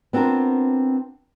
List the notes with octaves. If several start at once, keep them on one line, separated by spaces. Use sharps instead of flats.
B3 C4 D4 F4 A#4